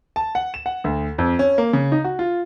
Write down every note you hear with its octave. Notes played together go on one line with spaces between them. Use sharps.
A5
F#5
E7
F#5
D2
F2
C#4
A#3
C#3
D#4
F#4
F4